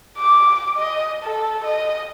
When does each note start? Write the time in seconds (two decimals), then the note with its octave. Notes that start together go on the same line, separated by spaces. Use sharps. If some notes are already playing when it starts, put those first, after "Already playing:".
0.18 D6
0.77 D#5
1.23 A4
1.64 D#5